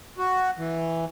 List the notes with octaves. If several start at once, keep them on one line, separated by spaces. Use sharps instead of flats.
F#4
E3